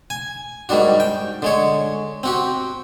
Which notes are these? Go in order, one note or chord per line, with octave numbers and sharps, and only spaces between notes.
G#5
G#2 D#3 G3 D4 F#4
G5
D3 G#3 C#5
C4 F#4 G4